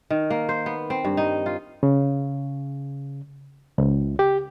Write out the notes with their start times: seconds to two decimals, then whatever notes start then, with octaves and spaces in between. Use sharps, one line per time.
0.10 D#3
0.30 A#3
0.49 C5
0.66 B3
0.90 C4
1.05 G2
1.17 D#4
1.46 F4
1.83 C#3
3.78 C#2
4.19 G4